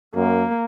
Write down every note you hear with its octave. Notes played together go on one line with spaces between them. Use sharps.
F#2 A#3